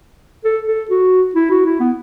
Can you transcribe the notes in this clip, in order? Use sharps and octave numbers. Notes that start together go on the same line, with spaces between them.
A4
A4
F#4
E4
F#4
E4
B3